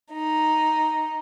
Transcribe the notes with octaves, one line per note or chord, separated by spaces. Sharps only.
D#4